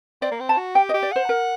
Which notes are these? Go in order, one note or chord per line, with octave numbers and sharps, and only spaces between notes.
C4 D5
A#3
C4
A5
F#4
G4 G5
D#5
G4
D5
C5 F#5
A#4